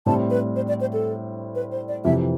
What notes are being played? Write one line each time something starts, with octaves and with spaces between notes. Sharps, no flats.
A2 G3 C4 A5
B4
C5
D5
C5
A4
B4
C5
D5
F2 C3 E3 E5